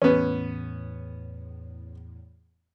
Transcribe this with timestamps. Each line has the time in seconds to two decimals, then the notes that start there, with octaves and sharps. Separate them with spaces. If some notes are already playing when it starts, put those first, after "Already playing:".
0.02 E2 A2 B3 C#4